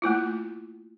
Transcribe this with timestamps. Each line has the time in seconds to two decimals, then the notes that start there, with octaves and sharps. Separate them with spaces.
0.02 A3 A#3 E4 F4